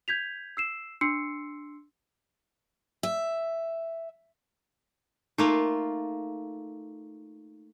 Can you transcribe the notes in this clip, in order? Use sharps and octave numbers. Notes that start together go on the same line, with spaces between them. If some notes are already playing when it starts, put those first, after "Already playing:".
G6 G#6 B6 F7
E6 C7 E7
D4 C6 E6 C7 C#7
E5
A3 A#3 D#4 F4